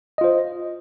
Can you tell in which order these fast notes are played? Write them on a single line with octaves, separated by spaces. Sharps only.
D#5 F4 C5